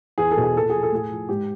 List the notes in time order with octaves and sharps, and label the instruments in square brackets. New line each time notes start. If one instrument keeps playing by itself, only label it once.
[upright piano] E2 G#4
A4
B2
G#4
A#2 A4
F3 G#4
A4
A2 G#4
F3
G#2 G4